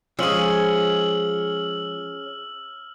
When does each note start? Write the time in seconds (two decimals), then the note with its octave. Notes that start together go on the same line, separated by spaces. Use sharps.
0.19 F3 G#3 C#4 G#4 E6 F6 F#7